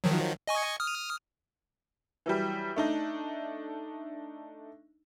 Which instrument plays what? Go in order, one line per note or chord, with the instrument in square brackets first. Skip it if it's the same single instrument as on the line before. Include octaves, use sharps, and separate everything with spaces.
[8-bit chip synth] D#3 F3 F#3
D#5 G#5 C#6
D#6 F6
[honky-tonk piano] E3 F#3 G3
A3 D4 D#4